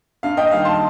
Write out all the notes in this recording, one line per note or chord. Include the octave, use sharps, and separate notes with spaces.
G2 F5
D#5 G5
D#3 G3 F5
A5 C6